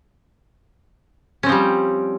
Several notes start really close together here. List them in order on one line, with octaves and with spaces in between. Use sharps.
C#4 C4 F3 G3